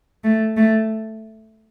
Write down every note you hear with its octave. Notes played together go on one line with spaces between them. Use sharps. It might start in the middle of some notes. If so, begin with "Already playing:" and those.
A3
A3